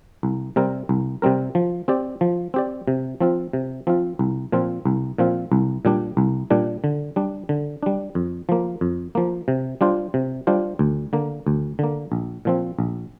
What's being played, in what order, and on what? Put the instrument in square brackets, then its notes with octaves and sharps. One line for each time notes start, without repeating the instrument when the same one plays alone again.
[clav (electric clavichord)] C2
C3 G3 C4 A#4
C2
C3 G3 C4 A#4
F3
C4 G4 D5
F3
C4 G4 D5
C3
F3 C4 F4
C3
F3 C4 F4
C2
A#2 F3 C4 F4
C2
A#2 F3 C4 F4
C2
A#2 G3 D4
C2
A#2 G3 D4
D3
G3 D4
D3
G3 D4
F2
F3 A#3
F2
F3 A#3
C3
G3 D4 F4 C5
C3
G3 D4 F4 C5
D2
D3 A#3
D2
D3 A#3
A#1
A#2 F3 C4
A#1